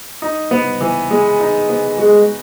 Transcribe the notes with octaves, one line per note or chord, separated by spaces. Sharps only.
D#4
B3
E3
G#3
D#4
B3
G#3 F#4